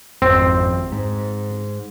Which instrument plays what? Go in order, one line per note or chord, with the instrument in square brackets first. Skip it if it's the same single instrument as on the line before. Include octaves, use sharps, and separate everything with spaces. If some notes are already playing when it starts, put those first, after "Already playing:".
[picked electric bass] G#1 F2 [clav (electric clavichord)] C4
[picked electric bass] G#2